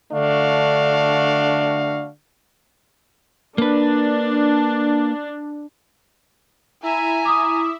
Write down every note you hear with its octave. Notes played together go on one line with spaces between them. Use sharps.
D3 A3 D4 F#4 F5
A#3 D4 B4
E4 E5 G#5 A#5
D6 D#6